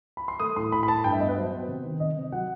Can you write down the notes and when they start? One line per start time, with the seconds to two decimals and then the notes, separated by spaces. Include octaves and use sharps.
0.17 B5
0.28 C6
0.40 A3 D#6
0.56 A2 C6
0.72 A2 B5
0.83 B5
0.88 A2 A5
1.04 G2 G5
1.12 E5
1.20 B3 D#5
1.29 B4
1.36 F#3 C5
1.53 B3
1.68 C3
1.85 D#3
2.00 C3 D#5
2.17 C3
2.32 F#3 F#5